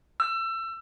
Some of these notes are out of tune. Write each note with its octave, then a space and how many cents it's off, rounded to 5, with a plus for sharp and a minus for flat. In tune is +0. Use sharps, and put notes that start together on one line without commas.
E6 +25